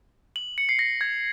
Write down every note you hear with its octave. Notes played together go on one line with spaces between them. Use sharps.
F#7
C#7
C7
A#6
G#6